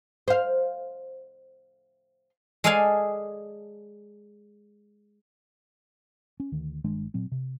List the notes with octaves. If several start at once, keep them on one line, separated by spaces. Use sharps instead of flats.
C5 F5
G#3 G#4 A4 D5 F5 G#5
C#4
D2 D#3
G1 D#3 G#3 D4
A#2 F#3 C4
C3